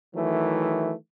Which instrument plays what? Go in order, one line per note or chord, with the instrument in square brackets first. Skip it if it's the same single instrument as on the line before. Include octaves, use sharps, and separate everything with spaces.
[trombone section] D#3 E3 F#3 A3